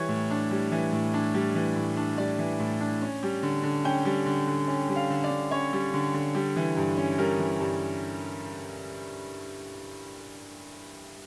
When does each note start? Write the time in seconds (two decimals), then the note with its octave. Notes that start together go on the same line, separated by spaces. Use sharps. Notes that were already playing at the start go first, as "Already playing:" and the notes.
Already playing: E3 G3 C#5
0.09 A2
0.31 D4
0.51 G3
0.72 E3
0.93 A2
1.14 D4
1.34 G3
1.55 E3
1.76 A2
1.97 D4
2.18 G3 D5
2.39 E3
2.60 A2
2.80 D4
3.02 C#4
3.23 G3
3.43 D3
3.63 D3
3.84 C#4 G5
4.05 G3
4.26 D3
4.47 D3
4.68 C#4
4.89 G3
4.96 F5
5.10 D3
5.24 D5
5.31 D3
5.51 C#4 C#5
5.73 G3
5.94 D3
6.14 D3
6.35 G3
6.56 E3
6.77 G2
6.97 C#4
7.18 G3 A#4
7.39 E3
7.60 G2